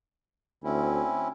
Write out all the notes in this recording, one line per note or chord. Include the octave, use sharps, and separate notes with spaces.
D2 C4 C#4 E4